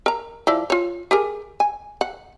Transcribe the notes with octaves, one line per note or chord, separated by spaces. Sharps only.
A#4 A#5
F3 E4 D5
F4 C#5
G4 G#4 A#4
G#5
F#5